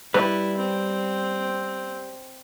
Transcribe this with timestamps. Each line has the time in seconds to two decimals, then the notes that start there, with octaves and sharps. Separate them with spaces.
0.14 G3 E4 B4
0.57 C4